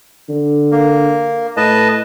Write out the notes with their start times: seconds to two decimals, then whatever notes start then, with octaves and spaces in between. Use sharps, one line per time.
0.29 D3
0.72 A#3
1.57 A2 B4 D#5 A5